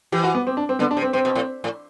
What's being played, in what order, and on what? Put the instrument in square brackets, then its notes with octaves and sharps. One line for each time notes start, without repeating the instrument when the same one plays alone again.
[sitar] E3 [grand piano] G4
[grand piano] F#4
B3
C4
D4
C4
[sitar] D3 [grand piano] B3
[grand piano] D4
[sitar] C3
[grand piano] C4
[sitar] C3 [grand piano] C4
[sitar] B2
A2
A2